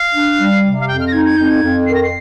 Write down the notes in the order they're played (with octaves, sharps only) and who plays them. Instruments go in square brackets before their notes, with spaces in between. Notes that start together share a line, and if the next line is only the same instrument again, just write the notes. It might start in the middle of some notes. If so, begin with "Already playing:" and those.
Already playing: [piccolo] F5
[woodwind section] D4
G3
C3
[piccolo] F5
[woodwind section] F2 [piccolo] G5
[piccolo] F6
A#6
[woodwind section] D#4 [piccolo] G#6
[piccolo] G#6
[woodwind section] F2 [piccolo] G6
[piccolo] G#6
[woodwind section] F2
[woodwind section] D#3 [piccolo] C7
[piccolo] A#6
C7